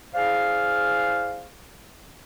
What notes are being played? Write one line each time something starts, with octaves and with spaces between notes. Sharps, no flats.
E4 G#4 C5 D5 F5